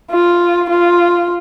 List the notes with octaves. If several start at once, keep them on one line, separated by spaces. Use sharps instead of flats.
F4
F4